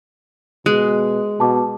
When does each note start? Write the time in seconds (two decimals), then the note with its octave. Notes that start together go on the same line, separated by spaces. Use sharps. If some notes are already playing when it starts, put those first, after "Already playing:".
0.66 B2 G#3 F#6
1.40 B2 A5 D6